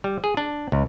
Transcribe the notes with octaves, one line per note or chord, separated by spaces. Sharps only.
G3
G#4
D4
C#2